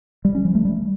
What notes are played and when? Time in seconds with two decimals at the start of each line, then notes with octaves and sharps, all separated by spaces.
0.25 G3
0.35 C#4
0.45 F3
0.55 A3
0.65 G3